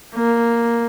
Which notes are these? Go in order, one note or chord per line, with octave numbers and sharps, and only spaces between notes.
A#3